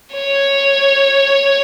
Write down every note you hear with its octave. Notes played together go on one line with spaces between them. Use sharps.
C#5